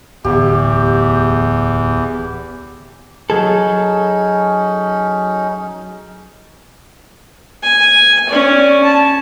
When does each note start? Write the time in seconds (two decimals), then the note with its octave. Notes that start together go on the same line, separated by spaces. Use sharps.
0.25 D1 E2 G4
3.30 F#3 C#4 D#4 G#4 A4
7.63 G#5
8.29 C#4 D5
8.83 A5